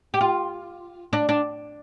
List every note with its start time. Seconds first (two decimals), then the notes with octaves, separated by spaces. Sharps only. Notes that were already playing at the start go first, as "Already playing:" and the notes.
0.14 G4
0.21 F4
1.13 D4
1.29 D4